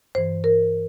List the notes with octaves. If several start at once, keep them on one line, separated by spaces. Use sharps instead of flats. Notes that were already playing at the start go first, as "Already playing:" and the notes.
G2 E3 C5
A#4